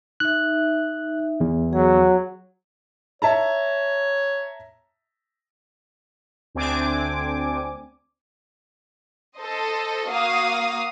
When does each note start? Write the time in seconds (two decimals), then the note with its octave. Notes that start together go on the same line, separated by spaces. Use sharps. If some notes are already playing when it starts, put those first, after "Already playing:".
0.20 D#4 E5 F#6
1.40 E2
1.73 F#3 G#4
3.22 C#5 E5 A5 A#5
6.55 D2 C4 D4 G#5 D6
9.37 A4 C5 D#5
10.08 A#3 F#4 F5 D#6